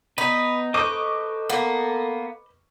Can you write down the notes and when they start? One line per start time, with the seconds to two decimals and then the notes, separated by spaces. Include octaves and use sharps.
0.18 B3 D#4 B4
0.74 A4 B4 C5 D#5 C#6 D6
1.49 A#3 B3